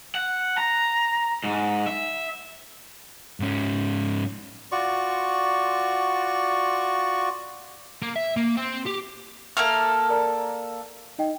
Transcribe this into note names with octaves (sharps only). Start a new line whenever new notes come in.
F#5
A#5
G#2
E5
G#2 C#4
F4 F#4 D5 C#6
A#3
E5
A#3
C4
G4
A#3 A4 E5 F6
A#4 D5 A#5
D#4 D#5 G5